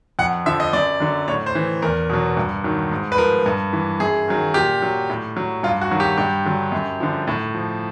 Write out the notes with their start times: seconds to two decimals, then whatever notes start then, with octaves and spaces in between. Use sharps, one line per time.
0.19 F2 F#5
0.46 D3 F3 E5
0.60 D#5
0.73 F#2 D5
1.00 D3 F#3
1.28 A2 C#5
1.46 C5
1.55 E3
1.82 E2 A#4
2.10 B2 F#3
2.37 G2
2.64 D#3 F#3
2.92 G#2
3.12 B4
3.18 F3 A#4
3.46 G2
3.73 E3
4.00 F#2 G#4
4.28 D#3 F#3
4.54 A#2 G4
4.82 F#3
5.10 A2
5.37 F#3
5.63 G2 F4
5.81 F#4
5.91 D#3 F#3
6.00 G4
6.18 G2 G4
6.45 D3 F#3
6.72 F#2
7.00 D3 F3
7.27 A2
7.55 F3